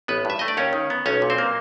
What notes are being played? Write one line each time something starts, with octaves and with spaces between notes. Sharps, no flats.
A1 B3 B4
G2 E5
A3 D#5
D5
D#2 C#4 C#5
D#3
B3
B1 C#4 C#5
A#2
C4 C5
A#3